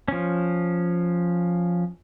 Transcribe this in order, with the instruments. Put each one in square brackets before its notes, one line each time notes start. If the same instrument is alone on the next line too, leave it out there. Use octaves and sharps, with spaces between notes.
[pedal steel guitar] F3 C#4